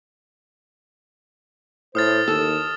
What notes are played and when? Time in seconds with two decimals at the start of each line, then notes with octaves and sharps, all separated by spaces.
1.95 A2 C5 D#6 F6 A6
2.28 D#2 A4 E6